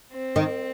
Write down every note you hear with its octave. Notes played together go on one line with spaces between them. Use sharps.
C4
D#3